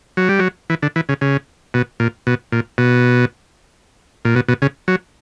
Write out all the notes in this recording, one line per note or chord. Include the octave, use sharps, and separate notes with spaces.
F#3
G3
F#3
E3
D3
E3
C#3
C#3
B2
A#2
B2
A#2
B2
A#2
B2
B2
C#3
F#3